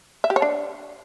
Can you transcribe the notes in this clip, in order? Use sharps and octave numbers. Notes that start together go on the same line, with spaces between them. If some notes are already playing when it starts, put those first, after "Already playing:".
E5
G4
C#5
D4